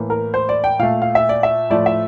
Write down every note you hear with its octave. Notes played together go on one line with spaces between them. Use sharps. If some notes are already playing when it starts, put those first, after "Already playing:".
Already playing: A2 E3 A#3
A#4
C5
D5
G5
A#2 A3 F5
F5
E5
D5
E5
A2 F3 A3 D5
E5